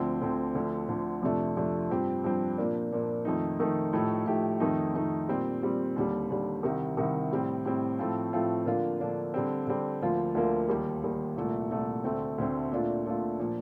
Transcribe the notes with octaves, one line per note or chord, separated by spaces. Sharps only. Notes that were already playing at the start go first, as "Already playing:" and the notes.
Already playing: D2 D3 F3 C4
D2 D3 F3 C4
D2 D3 F3
D2 D3 F3
F2 C3 F3 A3 D4
F2 C3 F3 A3 D4
G2 F3 C4 G4
G2 F3 C4 G4
A#2 F3 A#3 D4
A#2 F3 A#3 D4
F2 D#3 A3 D#4
F2 D#3 A3 D#4
A2 F3 A3 D#4 G4
A2 F3 A3 D#4 G4
F2 D#3 A3 D#4
F2 D#3 A3 D#4
A#2 G3 C4
A#2 G3 C4
D#2 D3 G3
D#2 D3 G3
C2 C3 D#3
C2 C3 D#3
A2 G3 C4
A2 G3 C4
A2 F3 A3 C4 F4
A2 F3 A3 C4 F4
D3 F3 A#3 D4 F4
D3 F3 A#3 D4 F4
D3 G3 C4
D3 G3 C4
D2 D3 F3 A#3 F4
D2 D3 F3 A#3 F4
D#2 D#3 G3
D#2 D#3 G3
C2 A#2 A3
C2 A#2 A3
D2 D3 A3 C4
D2 D3 A3 C4
A#2 A3 D4 F4
A#2 A3 D4 F4
A#2 F3